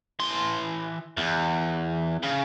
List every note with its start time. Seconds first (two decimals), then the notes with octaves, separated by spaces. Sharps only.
0.19 E3 C6
1.17 E2
2.23 C#3